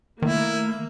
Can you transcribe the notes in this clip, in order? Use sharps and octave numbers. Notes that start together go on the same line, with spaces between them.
D#3 A3 A#3 E4